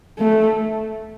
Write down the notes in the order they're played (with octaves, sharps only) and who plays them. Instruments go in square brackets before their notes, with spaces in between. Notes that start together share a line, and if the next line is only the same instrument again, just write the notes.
[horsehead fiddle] A3